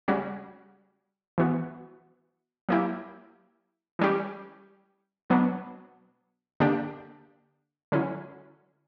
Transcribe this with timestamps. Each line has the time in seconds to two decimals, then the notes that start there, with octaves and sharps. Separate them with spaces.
0.08 C#3 G3 C#4 F#4
1.38 E3 B3 F#4
2.69 F#3 A#3 E4 G4
3.99 E3 G3 C#4 G4
5.30 B2 F#3 B3 D4
6.60 D3 A#3 D4 G4
7.92 D3 F#3 C#4 E4